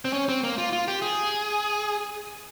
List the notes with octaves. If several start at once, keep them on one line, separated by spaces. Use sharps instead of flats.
C4
C#4
C4
A#3
F4
F4
G4
G#4